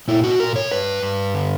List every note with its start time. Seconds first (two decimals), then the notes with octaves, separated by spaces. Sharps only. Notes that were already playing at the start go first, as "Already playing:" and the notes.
0.08 A#2 E4
0.23 F#4
0.39 A#2 A#4
0.56 C#5
0.71 G2 B4
1.03 G2
1.34 D3